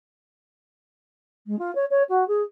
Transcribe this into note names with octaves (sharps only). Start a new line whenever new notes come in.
G#3
F4
C#5
C#5
F#4
G#4